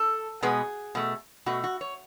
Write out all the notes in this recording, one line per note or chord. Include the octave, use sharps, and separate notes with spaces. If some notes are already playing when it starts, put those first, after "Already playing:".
Already playing: A4
B2 G#3 B3 G#4
B2 A3
B2 A3 F#4
F#4
C#5